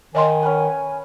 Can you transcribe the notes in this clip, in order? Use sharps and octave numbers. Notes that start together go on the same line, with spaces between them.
D#3 C#5 D#5 G#5 C6
C#4 B4 F#5